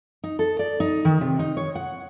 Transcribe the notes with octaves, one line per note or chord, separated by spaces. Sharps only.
D#4
A4
D5
D#4
D#3
C3
D#4
C#5
F#5